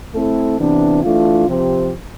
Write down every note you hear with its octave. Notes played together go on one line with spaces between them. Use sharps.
A3 C4 E4 A4
C3 E3 B3 D4
E3 A3 D4 F4
C3 F3 C4 G4 C5